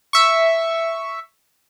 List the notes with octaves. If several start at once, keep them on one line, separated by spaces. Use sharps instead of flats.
E5 C#6